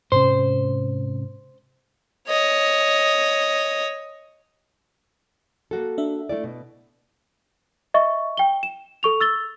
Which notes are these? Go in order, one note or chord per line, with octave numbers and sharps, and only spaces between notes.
G#2 C3 C#4 C5
C#5 D#5
A#3 F#4 A4
D4 E5
A3 E4 D5
B2
D#5 E5 C#6
G5 G7
E7
A4 C#6 F7
E6 A6 G7